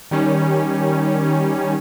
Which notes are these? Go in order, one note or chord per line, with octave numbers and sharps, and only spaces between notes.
D#3 G3 C#4